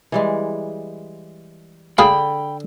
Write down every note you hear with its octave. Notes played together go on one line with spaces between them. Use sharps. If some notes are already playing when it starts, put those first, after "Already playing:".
E3 G3 G#3
D3 G#4 F5 G5 B5